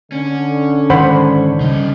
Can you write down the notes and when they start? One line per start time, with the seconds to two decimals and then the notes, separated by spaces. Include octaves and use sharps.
0.12 D3 C#4
0.90 G#2 D#3 C5 F#5 B5
1.61 C#3 G3 C#4 D#4